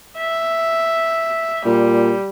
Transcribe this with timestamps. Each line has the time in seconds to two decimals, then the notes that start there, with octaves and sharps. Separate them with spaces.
0.18 E5
1.66 A#2 G3